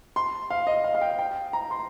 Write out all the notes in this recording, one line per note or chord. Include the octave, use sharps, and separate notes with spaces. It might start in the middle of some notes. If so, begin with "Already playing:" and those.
C6
F5
D#5
F5
F5
G5
G5
A#5
C6